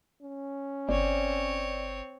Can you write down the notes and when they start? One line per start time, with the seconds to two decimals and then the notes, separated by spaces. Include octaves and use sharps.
0.22 C#4
0.89 G1 C4 C#5 D5